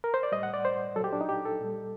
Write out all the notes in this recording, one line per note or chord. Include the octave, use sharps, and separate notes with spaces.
A#4
C5
D5
A2 G3 D#5
F#5
D5
C5
A#2 F#3 G4 A4
D4
D#4
G4
A4
A#2 G3